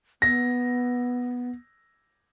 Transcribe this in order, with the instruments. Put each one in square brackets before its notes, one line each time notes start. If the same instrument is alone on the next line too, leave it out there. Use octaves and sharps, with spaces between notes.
[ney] B3 [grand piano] A#6